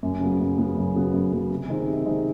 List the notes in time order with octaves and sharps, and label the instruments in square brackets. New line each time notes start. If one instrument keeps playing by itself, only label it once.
[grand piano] F#2
C#3 F#3 B3
F#2
C#3 F#3 B3
F#2
C#3 F#3 B3
F#2
C#3 F#3 B3
C3
D#3 G#3 C4 D#4
C3
D#3 G#3 C4 D#4